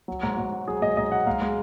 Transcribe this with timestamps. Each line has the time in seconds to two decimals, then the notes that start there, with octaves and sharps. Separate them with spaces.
0.08 F#3
0.23 G#2
0.37 G#2 F#4
0.52 F#3
0.68 F#3 G#4
0.82 G#2 D#5
0.97 G#2 D#5
1.11 F#3 F#5
1.27 G#2 F5
1.42 G#3